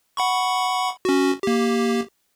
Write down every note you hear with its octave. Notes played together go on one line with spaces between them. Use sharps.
F#5 B5 C#6
C#4 F#4
A#3 G4